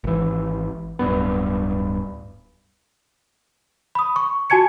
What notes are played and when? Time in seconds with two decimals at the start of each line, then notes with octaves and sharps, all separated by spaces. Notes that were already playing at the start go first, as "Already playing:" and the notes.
0.04 G#1 E3
0.99 D1 G#1 G2 B3
3.95 B5 D#6
4.16 C#6
4.50 F#4 G#5 A5 G#6 C#7